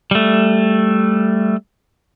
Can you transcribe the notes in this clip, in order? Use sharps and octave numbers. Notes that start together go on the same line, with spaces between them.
G3 A3